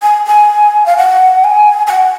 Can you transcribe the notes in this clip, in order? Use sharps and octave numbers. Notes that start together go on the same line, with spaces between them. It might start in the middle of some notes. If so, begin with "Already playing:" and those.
G#5
G#5
F5
F#5
G#5
G#5
F#5